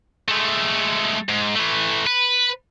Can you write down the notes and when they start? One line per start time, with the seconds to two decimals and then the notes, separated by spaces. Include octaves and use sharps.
0.28 G#3 A3
1.29 G#2
1.56 E3 A3
2.07 B4